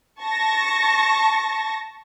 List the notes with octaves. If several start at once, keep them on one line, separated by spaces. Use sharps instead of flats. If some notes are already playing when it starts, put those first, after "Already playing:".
A5 C#6 A#6